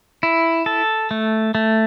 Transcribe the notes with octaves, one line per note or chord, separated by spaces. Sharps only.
E4
A4
A3
A3